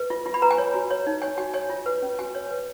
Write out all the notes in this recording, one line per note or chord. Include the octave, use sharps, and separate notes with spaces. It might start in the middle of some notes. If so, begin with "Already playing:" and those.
Already playing: B4
F4
F4
B5
B4 A#5
G#5
C#5
F#4
C#5
D#4
C#5 G#5
F#4 G#5
C#5 G#5
F4
B4
C#4
F#4 G#5
C#5
B4